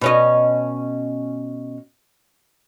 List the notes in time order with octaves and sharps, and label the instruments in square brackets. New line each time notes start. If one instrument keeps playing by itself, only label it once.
[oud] B2 C#4 D#5